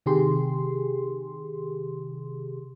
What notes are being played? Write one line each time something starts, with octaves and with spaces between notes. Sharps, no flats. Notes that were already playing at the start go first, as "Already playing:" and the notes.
C3 D#3 G4 G#4 C6